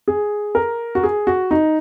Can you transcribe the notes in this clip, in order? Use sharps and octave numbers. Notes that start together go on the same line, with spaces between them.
G#4
A#4
F#4
G#4
F#4
D#4